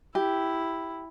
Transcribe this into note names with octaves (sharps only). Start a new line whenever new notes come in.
E4 G4